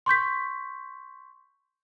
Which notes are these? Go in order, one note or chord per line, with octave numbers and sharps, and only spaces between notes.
C6 C#6 G6 B6